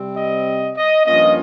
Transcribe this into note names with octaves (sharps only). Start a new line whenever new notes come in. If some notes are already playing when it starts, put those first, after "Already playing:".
Already playing: C3 G3 C4
D#5
D#5
G2 F3 A#3 C#4 F4 D#5